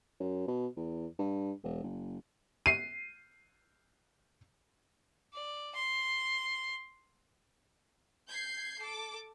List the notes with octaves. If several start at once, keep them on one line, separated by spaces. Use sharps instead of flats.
F#2
B2
E2
G2
E1
F#1
C7 D#7
D5
C6
G6 G#6 C7
A4 D6